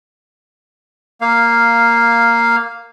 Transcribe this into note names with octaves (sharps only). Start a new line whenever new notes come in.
A#3 F5